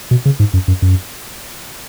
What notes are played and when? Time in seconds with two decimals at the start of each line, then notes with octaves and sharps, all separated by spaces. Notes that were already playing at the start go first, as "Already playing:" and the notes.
0.11 B2
0.25 C#3
0.40 G#2
0.53 F#2
0.68 F#2
0.82 F#2